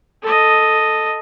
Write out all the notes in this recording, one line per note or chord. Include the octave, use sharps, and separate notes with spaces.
A4 D#5